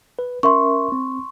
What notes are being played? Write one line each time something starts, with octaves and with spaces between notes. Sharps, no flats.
B4
C#4 A#4 E5 C6 C#6
C4